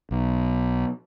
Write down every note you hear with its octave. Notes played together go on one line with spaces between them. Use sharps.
B1